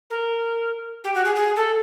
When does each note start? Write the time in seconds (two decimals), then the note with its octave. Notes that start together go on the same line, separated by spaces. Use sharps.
0.10 A#4
1.04 G4
1.14 F#4
1.25 G#4
1.35 G#4
1.56 A4